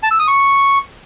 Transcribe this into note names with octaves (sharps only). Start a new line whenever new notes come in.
A5
E6
D#6
C#6